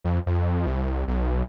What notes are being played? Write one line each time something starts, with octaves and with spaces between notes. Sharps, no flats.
F2
F2
C2
B1